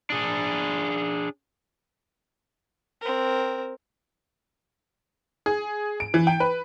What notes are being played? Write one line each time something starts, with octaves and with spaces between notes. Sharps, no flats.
D4 G#4
C4 A#4
G#4
D7
E3
G5
B4